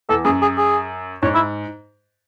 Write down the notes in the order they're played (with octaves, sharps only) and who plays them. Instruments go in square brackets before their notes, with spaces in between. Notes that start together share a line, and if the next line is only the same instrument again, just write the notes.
[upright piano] E2 [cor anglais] A4
[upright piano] F#2 [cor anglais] G#4
[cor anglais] G#4
G#4
[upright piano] G#2 [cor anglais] C#5
[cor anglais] E4